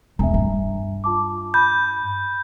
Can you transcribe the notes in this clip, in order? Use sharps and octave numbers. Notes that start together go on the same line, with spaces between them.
E1 E5 G#5 A#5
G2
F4 A5 D6
B5 G6